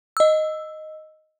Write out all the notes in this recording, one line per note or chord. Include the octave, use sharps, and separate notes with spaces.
D#5 E6